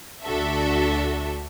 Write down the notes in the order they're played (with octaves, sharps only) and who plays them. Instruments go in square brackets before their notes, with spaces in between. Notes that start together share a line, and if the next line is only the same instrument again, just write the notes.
[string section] D2 D4 F#4 A4 E5